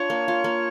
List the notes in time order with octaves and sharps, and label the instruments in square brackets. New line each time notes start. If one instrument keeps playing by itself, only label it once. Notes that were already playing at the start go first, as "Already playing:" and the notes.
Already playing: [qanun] D4 F4 [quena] C#5
[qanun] A#3
F4
A#3